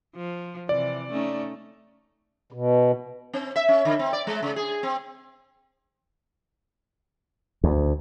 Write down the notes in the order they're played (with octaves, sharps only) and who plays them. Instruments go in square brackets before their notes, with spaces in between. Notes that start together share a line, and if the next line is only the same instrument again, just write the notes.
[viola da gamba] F3
[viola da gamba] C3 E3 [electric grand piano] D5
[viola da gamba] A3 C#4 D#4
[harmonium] B2
[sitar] C4
E5
C#4
D3
C4
D5
G#3
C#3
G#4
C4
[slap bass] D2